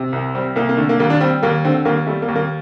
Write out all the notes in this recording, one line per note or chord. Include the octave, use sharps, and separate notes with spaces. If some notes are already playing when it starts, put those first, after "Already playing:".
Already playing: C3
C2
G3 C4
C2 A#3
A#3
D3 A3
A#3
D#2 A#3
D4
G3 C4
D#2 A#3
D3 C4
D#2 A#3
G3 A3
A#3
D#2
A#3